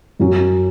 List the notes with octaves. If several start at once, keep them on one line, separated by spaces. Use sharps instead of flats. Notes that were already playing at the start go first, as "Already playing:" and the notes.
F#2 F#3 C#4